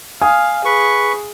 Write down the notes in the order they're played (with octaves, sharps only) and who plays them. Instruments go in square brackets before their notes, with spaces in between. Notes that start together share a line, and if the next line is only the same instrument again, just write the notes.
[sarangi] F5 [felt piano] G#5 D#6
[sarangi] G#4 [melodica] B4 C#6